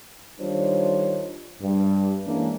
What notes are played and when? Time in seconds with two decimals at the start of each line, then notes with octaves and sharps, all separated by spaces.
0.40 D#3 G3 D4 F4 C5 C#5
1.61 G2
2.26 E3 G#3 A#3 C#4 D4